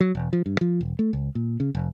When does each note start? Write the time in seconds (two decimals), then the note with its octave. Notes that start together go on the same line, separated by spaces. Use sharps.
0.01 F#3
0.15 E1
0.33 F3
0.46 G2
0.61 F3
0.81 E1
0.99 A3
1.13 C#2
1.35 A#2
1.60 C#3
1.75 F1